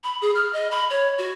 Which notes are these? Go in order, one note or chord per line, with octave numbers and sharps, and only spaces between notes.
B5
G#4
F6
D#5
B5
C#5
F#4